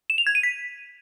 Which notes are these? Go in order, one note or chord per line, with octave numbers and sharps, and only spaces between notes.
E7
F7
G#6
D#7
B6